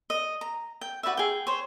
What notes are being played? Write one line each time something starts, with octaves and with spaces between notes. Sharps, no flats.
D#5
A#5
G5
F#4 B4 D5 E5
G#4 G5
C5 C#5